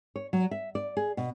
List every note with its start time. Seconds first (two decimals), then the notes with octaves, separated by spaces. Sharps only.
0.16 C#5
0.33 F#3
0.51 E5
0.75 D5
0.97 G#4
1.17 B2